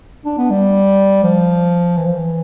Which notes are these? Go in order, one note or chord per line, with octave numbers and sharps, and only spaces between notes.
D4
B3
G3
F3
E3
F3
E3